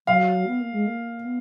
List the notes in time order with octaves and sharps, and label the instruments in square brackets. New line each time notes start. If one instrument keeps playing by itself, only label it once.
[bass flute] F#3 [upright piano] F5
[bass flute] B3
A#3
G#3
A#3
B3